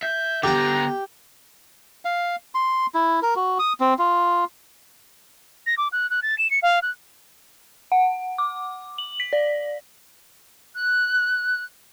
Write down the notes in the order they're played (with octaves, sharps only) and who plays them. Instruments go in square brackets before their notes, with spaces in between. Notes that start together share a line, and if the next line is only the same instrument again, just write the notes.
[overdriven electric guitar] E5 [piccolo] G6
[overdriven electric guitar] D3 B3 [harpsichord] G4 G5 [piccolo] A#5
[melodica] F5
C6
E4
A#4
F#4
D#6
C4
F4
[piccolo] A#6
D6
F#6
F#6
A6
E7
C#7
F5
F#6
[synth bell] F#5
D6
F#7
B6
D5
[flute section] F#6